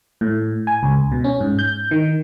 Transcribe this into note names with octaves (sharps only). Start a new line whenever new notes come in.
A2
G#5
C#2
B2
C#4
G#2
G6
D#3